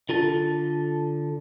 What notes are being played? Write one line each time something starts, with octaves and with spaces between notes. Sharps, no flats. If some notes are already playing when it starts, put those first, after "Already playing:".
D3 F4 A4 A5